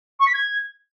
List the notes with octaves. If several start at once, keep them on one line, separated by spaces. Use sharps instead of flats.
C#6
B6
G#6